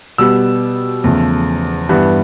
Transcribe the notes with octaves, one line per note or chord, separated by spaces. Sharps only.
B2 G3 B3 E6
E2 C#3 F3 A3
G2 E3 G3 B3